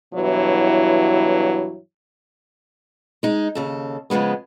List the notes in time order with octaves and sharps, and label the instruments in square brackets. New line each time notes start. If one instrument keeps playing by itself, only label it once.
[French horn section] G2 B2 E3 F#3 E4 C#5
[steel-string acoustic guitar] G#3 D#4
D#2 C#3 A4
C#3 F3 F#3 G#3 B3